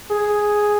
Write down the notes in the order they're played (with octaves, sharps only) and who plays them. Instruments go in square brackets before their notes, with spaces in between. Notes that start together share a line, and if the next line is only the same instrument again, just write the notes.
[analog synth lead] G#4